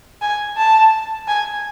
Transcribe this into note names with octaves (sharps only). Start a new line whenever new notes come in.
G#5
A5
G#5